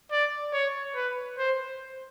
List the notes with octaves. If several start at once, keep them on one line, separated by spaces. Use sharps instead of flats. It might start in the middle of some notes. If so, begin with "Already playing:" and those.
D5
C#5
B4
C5